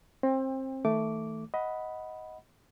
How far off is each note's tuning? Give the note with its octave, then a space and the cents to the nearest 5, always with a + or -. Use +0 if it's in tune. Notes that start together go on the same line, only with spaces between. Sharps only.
C4 +25 G5 +35
D#3 +35 A3 +0 D6 -15
D#5 +15 F#5 +0 B5 +0